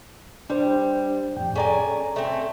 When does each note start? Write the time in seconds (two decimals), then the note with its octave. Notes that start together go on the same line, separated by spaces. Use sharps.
0.50 G3 D4 C5
1.37 F2 A2 G5
1.55 C#4 G#4 A4 D5 G#5 A#5
2.16 A3 C4